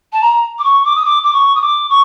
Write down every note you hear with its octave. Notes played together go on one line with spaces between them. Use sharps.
A5
A#5
D6
C#6
D6
D#6
D6
D6
C#6
D#6
D6
C#6